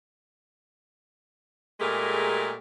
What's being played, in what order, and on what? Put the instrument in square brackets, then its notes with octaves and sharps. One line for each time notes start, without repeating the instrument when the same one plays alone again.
[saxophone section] A#2 G#3 A3 G4 G#4 A#4